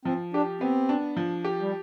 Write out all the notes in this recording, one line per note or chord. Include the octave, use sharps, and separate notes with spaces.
F3 C4
D4 G4
B3 C4
D4
F3
G4
G3